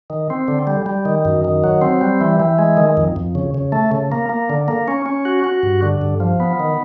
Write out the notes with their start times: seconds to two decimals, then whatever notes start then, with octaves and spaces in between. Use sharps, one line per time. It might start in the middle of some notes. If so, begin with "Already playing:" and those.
0.10 D#3
0.30 C4
0.48 D3
0.67 G3
0.86 G3
1.05 D#3
1.25 F#2
1.45 D#3
1.64 F#3
1.82 C4
2.01 G3
2.21 E3
2.40 E3
2.59 G#3
2.77 D#3
2.97 F2
3.16 F2
3.35 C#3
3.54 C#3
3.72 A3
3.92 C#3
4.12 A#3
4.29 A#3
4.50 D3
4.68 A#3
4.88 C#4
5.06 C#4
5.25 F#4
5.44 F#4
5.63 G2
5.82 D3
6.01 G2
6.20 F3
6.40 B3
6.60 D#3